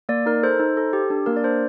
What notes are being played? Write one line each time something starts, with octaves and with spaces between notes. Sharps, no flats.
A#3 D5
D#4 A#4
A4 C5
D#4
A4
G4
D4
A#3 A#4
D5
D4 C5